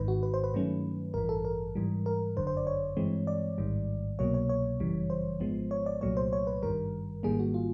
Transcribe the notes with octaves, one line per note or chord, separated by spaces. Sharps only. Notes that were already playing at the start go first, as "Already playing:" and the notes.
Already playing: G#1 G#2 D#3 B4
F#4
B4
C5
B4
G2 D#3 F#3 A3 C#4
A1 G2 E3 A#4
A4
A#4
G#2 E3 G3
A#4
G1 F#2 D3 C5
C5
D5
C#5
G2 E3 G#3 C4
D5
A1 G#2 D#3 G3
C2 B2 F#3 A#3 C#5
C#5
C#5
G1 F#2 C#3 E3 G3
C5
G#1 G#2 F3 G#3 B3
C#5
D5
C2 A#2 F#3 A3 C#5
C5
C#5
B4
G#1 G2 D#3 G3 A#4
G#1 G#2 D#3 G3 A#3 G#4
F#4
F4